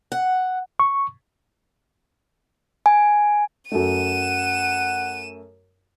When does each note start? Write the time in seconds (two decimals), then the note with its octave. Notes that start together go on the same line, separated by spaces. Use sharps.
0.12 F#5
0.80 C#6
2.86 G#5
3.72 F#2 A3 F#5 D#7 E7